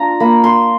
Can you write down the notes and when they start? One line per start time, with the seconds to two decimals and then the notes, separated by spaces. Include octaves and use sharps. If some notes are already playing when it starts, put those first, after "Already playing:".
Already playing: D4 F4 A#5
0.20 A#3 B5
0.44 C6